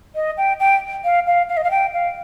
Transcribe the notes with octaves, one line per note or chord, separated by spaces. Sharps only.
D#5
G5
G5
F5
F5
F5
D#5
F5
G5
F5